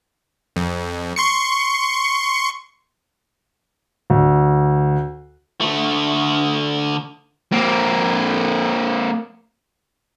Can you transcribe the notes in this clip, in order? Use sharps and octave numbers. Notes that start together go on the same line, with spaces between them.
F2
C6 C#6 C#7
D2
D3 A3
A#3 C4